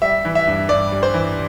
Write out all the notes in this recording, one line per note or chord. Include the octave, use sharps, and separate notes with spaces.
G3 E5
E3
E5
G2
G2 D5
G3
C5
E3